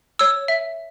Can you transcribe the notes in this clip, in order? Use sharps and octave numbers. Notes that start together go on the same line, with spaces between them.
C#5 E6
E5